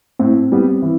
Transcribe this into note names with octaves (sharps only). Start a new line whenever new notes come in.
A2 C4
G3 B3
E3